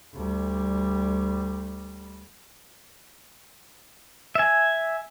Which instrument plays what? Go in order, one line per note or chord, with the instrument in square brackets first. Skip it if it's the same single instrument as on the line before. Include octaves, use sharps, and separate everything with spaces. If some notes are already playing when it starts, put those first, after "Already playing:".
[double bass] D2 G3
[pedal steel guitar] E5 G#5